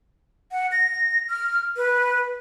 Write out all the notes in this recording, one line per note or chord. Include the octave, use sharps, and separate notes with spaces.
F#5
A#6
F6
B4